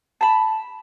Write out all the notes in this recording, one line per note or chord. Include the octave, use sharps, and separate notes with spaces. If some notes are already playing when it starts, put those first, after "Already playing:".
A5 B5